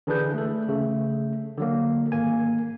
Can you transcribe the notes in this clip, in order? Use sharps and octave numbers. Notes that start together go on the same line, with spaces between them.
D3 E3 D4 G#4 B4 G6
A3 A4
C#3 A3
D3 F#3 A#3
G#1 A#3 G#5